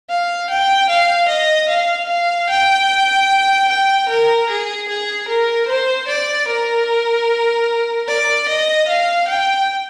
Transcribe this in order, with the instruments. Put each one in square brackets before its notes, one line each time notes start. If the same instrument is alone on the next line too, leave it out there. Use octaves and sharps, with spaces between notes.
[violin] F5
G5
F5
D#5
F5
F5
G5
G5
A#4
G#4
G#4
A#4
C5
D5
A#4
D5
D#5
F5
G5